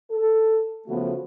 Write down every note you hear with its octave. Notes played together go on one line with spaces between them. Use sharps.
A4
C#3 F3 A3 B3 F#4